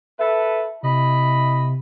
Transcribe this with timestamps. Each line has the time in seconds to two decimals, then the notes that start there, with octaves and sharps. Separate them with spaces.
0.19 A4 B4 E5
0.83 C3 E4 D#5 B5